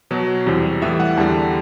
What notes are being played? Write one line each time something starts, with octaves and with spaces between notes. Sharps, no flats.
B2 F#3
E2 C3 G3
A2 E3 G3 E5
F#5
E2 D3 G3 A5